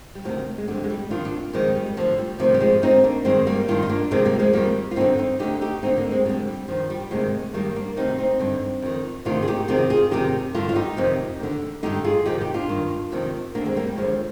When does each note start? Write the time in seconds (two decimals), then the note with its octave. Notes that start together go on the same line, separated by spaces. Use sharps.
0.15 G3
0.25 D2 C3 D#3 F3
0.58 G#3
0.68 F2 D3 G3
0.84 G#3
0.90 G3
1.10 F2 D#3 D4 F4
1.25 D4 F4
1.53 F2 D#3 F3 G#3
1.75 G3
1.97 D2 D3 F3
2.18 G3
2.39 D2 C3 D#3 F3
2.55 G3
2.60 F3 G#3
2.82 D2 D3 C4 D#4
3.04 A#3 D4
3.25 G2 D#3 G#3 C4
3.47 G3 A#3
3.68 G2 D#3 D4 F4
3.83 D#4
3.89 A#3 D4
4.11 F2 C3 D#3 G#3 C4
4.25 G3 A#3
4.39 F3 G#3
4.53 F2 C3 D#3 G3 A#3
4.91 F4
4.96 G2 D3 C4 D#4
5.18 C4 D#4
5.40 D2 D3 D#4 G4
5.61 D#4 G4
5.82 D2 D3 C4 D#4
5.97 A#3 D4
6.11 G#3 C4
6.25 F2 D3 G3
6.47 G3
6.68 G2 D#3 F3
6.90 G3
7.11 D2 C3 D#3 F3 G#3
7.54 G2 D#3 G3 A#3
7.76 A#3 D4
7.97 D2 C3 D#3 C4 D#4
8.18 C4 D#4
8.39 G2 D3
8.82 F2 D#3
9.25 D2 C3 D#3 D4 F4
9.42 G#4
9.48 D#4 G4
9.68 F2 C3 D#3 F4 G#4
9.90 F4 G#4
10.11 F2 C3 D#3 D#4 G4
10.55 G2 D3 D4 F4
10.69 F4
10.75 D#4 G4
10.97 F2 C3 D#3
11.40 D#2 D3
11.83 G2 D3 D#4 G4
12.05 F4 G#4
12.25 F2 C3 D#3 D#4 G4
12.41 D#4 G4
12.54 D4 F4
12.69 G2 D#3
13.12 F2 C3 D#3
13.55 D#2 D3 A#3 D4
13.65 G#3 C4
13.76 G3 A#3
13.87 G3
13.97 D#2 D3 F3 G#3